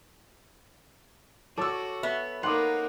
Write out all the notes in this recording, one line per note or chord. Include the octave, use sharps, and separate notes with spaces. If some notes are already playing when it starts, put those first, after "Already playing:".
F#4 A4 C#5 D6 E6
B3 E5
A#3 D#4 F#5 C6 D6 D#6